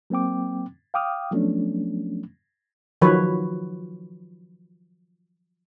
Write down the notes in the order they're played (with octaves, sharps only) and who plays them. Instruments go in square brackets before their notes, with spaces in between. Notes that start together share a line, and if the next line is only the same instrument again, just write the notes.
[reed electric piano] F#3 A#3 C4 G5 D6
F5 G5 D6 D#6 F6
F3 F#3 A3 B3 C#4 D4
[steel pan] D#3 F3 F#3 B4 C#5